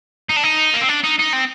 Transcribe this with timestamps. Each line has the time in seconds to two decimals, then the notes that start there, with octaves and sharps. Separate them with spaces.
0.29 D#4
0.36 D4
0.43 D#4
0.74 A#3
0.81 C4
0.89 D4
1.04 D#4
1.19 D#4
1.33 C4